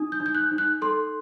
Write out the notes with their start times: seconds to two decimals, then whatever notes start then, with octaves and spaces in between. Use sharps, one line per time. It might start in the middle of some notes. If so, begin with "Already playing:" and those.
Already playing: D#4 D#6
0.12 G6
0.20 D#4
0.26 G6
0.35 F#6
0.51 D#4
0.58 F#6
0.82 A4 C6